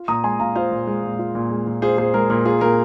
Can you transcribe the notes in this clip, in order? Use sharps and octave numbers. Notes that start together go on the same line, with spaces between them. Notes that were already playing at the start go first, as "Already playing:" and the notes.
Already playing: F4
A#2 A#5 D#6
G#3 G#5 C6
A#2 F5 A#5
F4 C5 F5
A#2
G#3
A#2
F4
A#2
G#3
A#2
F4 G#4 C5
A#2 G#4 C5
G#3 A#4
A#2 A#4
F4 G#4
A#2 A#4